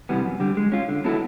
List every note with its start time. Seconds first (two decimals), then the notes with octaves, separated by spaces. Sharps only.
0.09 C3 E3 G3 B3
0.25 F#2
0.40 D3 G3
0.57 G#3
0.72 C#4 F4
0.89 D3
1.04 F#3 B3 E4 A4